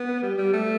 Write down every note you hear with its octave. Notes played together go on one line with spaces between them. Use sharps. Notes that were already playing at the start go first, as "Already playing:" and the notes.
Already playing: B3
G3
G3
A3